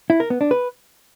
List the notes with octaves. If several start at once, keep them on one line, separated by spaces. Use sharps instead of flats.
E4
A#4
B3
D4
B4